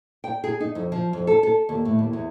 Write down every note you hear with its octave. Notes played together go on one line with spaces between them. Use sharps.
G5
G#4
D#4
F2
F3
F2
A4
A4
D#2
A2
D#2
E2